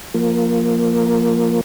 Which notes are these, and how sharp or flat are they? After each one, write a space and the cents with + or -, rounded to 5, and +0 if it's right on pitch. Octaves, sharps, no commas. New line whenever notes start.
F3 +0 A#3 +0